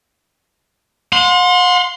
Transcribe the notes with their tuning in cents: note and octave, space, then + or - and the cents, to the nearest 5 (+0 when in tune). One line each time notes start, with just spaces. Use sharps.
F#5 -45 C6 +0